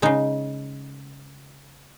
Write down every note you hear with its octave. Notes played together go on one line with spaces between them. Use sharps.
C#3 G#3 D#4